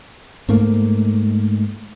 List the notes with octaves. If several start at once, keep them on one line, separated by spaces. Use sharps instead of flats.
G#2 A3 A#3